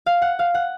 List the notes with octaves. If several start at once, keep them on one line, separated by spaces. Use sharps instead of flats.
F5
F#5
F5
F#5